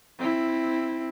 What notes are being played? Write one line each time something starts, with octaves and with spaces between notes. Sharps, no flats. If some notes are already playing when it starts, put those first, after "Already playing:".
C4 E4